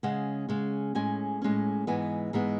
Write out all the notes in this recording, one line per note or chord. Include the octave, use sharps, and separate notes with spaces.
C#3 G#3 C#4 F#5
C#3 G#3 C#4
A2 G#3 C#4 G#5
A2 G#3 C#4
G#2 E3 G#3 B3 G#5
G#2 E3 G#3 B3